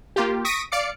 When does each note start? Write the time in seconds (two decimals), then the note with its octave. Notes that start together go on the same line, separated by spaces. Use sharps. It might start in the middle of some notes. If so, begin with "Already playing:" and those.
0.16 A#3 F4 G4
0.45 C#6 D#6 A#6 B6 D7 D#7
0.72 D5 F5 D6 C#7